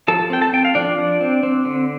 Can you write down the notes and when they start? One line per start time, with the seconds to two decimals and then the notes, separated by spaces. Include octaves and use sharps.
0.08 F3 A4 A5
0.30 C4 G5
0.41 A4 A5
0.53 C4 G5
0.65 F5
0.75 F3 D4 D5
0.98 F3
1.21 C4
1.43 C4
1.65 D3